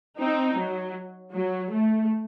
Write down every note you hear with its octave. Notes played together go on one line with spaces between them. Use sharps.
C4 D#4
F#3
F#3
A3